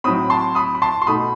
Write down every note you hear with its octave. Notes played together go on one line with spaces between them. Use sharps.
A2 F#3 C4 B5 D#6
A5 C6
B5 D#6
B5
A5 C6
C6
B2 A3 D#4 B5 D#6